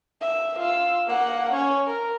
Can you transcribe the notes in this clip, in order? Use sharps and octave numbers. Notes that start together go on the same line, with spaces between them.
E5
F4 E6
A#3 F#5
C#4 C#5
A#4